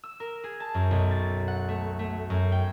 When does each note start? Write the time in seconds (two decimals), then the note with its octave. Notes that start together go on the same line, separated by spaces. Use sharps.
0.04 E6
0.20 A#4
0.44 G#4
0.60 A5
0.74 F#2
0.91 B1
1.11 A6
1.48 F#5
1.69 A3
1.99 A3
2.30 F#2
2.52 G5